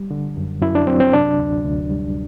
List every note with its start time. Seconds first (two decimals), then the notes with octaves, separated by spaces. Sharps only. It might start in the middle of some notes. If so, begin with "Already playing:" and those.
Already playing: G3
0.11 D3
0.37 F#2
0.62 F#2 E4
0.75 D4
0.87 F#3 C4
1.00 C4
1.13 C3 D4
1.39 D2
1.65 D2
1.90 G3